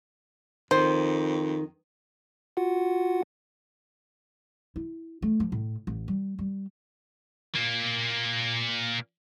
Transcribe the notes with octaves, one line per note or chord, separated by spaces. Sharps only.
F2 D#3 C5
F4 F#4 F#5
E4
A3
F3
A2
A1
G3
G3
A#2 A#3